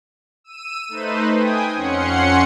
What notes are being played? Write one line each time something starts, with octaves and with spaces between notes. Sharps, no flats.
E6 D#7
A3 D#4 B4 C5
G5 G#5 D#6
F2 C#4 F#5 C6 C#7